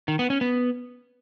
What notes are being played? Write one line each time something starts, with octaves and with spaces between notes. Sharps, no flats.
D#3
B3
C#4
B3